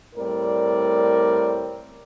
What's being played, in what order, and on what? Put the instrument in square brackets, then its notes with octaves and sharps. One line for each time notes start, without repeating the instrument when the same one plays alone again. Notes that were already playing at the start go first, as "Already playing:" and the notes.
[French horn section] A2 G3 C4 A#4 D5